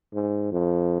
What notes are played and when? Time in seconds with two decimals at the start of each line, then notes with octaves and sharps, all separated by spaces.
0.14 G#2
0.52 F2